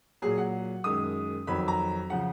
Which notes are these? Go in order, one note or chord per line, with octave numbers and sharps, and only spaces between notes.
A#2 F#3 G#4
F#5
F#2 D#3 G#3 D#6
F2 D#3 F#3 B5
A#5
C#3 F3 F#5